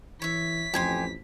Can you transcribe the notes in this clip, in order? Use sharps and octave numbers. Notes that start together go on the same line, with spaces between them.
E3 C#5 E5 B6
A1 F2 G4 G#5 C6